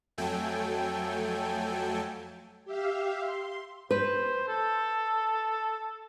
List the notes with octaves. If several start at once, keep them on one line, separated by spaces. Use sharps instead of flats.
F2 F#3 A3 A4 G5 G#5
G4 E5 F5
C6
B4 C5
A4